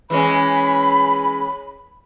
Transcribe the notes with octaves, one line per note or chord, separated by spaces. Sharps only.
E3 G#3 C#4 B5